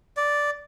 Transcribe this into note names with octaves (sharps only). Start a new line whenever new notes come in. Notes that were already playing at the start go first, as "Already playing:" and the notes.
D5